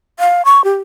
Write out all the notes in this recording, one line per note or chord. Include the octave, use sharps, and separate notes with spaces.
F5
C#6
G4